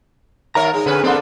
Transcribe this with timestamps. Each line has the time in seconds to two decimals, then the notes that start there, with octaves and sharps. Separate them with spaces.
0.55 D#2 A#4 C#5 E5 A#5
0.74 G#3 D#4 G#4
0.86 D3 C4 C#4 B4
1.04 A#3 C4 D4 A4 C6